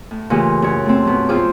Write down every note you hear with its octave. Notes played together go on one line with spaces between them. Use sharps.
A2
A#2 C#3 E3 A3 C#4 G4
F#2 C#5
A3 C4
B2 F#3
F2 C4 F4 G#4 C5 D6